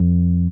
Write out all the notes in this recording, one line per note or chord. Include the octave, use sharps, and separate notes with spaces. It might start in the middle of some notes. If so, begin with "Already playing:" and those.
Already playing: F2